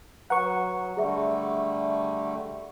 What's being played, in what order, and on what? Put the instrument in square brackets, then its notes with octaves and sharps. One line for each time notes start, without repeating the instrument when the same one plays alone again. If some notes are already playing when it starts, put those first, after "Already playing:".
[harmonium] F#3 [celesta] B4 A#5 [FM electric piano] F#5 C#6
[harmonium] D3 G3 A3 [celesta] G#4 E5